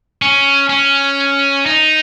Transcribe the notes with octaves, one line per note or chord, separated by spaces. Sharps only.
C#4
C#4
D#4